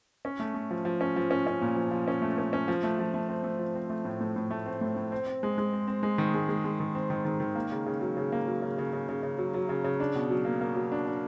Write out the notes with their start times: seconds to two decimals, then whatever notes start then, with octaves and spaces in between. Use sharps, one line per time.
0.25 C#4
0.40 A3
0.54 A3
0.71 F3
0.85 F3
1.01 C#4
1.16 F3
1.31 C#4
1.47 C#4
1.61 A#2
1.76 F3
1.91 F3
2.08 C#4
2.22 A3
2.38 C#4
2.53 C#4
2.68 F3
2.83 A3
2.99 F3
3.14 A3
3.28 C4
3.44 A3
3.59 F3
3.75 C4
3.90 A3
4.05 A2
4.21 A2
4.36 A2
4.51 A3
4.66 C4
4.81 A2
4.96 A2
5.12 C4
5.27 C4
5.43 G#3
5.58 G#3
5.73 C4
5.88 C4
6.03 G#3
6.18 D#3
6.34 G#3
6.49 G#3
6.64 G#3
6.80 D#3
6.95 C4
7.10 D#3
7.25 D#3
7.40 D#3
7.55 A#3
7.72 C#3
7.86 C#3
8.01 F#3
8.17 C#3
8.32 A#3
8.47 F#3
8.62 C#3
8.78 C#3
8.93 C#3
9.09 C#3
9.23 C#3
9.38 F#3
9.54 F#3
9.69 C#3
9.84 C#3
10.00 D4
10.15 B2
10.30 F#3
10.45 A#3
10.61 A#3
10.76 F#3
10.92 D4
11.07 D4